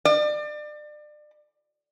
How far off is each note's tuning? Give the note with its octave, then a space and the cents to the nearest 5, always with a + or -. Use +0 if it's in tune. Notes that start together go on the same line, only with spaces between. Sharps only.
D5 +30